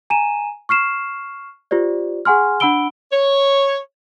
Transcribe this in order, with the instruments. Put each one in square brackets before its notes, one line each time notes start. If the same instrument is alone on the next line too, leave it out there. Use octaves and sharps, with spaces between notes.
[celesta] G#5 A#5 D#7 E7
C#6 F6 C7 E7
F4 G4 C5 D5
G#4 F#5 G#5 C6 F6
D4 F#5 B5 E6 D7 G7
[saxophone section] C#5